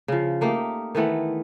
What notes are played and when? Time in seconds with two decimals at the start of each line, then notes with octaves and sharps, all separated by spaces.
0.08 C#3 F3
0.41 A3 A#3 D#4 G4
0.95 D#3 E3 A3 B3